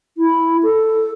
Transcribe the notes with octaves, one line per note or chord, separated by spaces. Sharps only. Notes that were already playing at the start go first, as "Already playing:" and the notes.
E4
A4